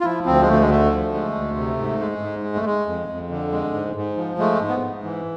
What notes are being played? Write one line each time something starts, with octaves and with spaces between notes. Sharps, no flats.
F4
F3 E4
D2 C4
G#3
D2 A3
G#3
D3 A3
F3
G#3
D2
C3
G#2
G#3
G#2
G#3
A3
G#3
F2
F2
D3
G#3
G#2
G#2
F3
G#3 A3
G#2
B3
G#2
E3